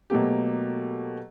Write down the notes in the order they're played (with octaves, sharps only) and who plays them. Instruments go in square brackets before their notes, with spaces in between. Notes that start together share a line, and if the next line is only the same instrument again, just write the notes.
[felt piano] B2 F#3 A3 A#3 G4